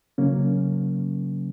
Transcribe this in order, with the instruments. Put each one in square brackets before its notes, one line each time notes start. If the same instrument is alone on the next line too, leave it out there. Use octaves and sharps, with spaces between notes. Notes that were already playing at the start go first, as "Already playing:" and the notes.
[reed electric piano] C#3 F#3 A#3 C#4